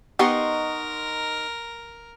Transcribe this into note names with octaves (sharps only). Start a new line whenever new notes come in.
B3 D#4 G4 A#4 D#5 F#5 C6 C#6